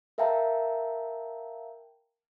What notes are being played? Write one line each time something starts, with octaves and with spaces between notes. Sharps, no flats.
A#4 E5 F5 G5 A5 A#5